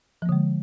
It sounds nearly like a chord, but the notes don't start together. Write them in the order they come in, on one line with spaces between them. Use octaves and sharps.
F3 A#3 D3 G#3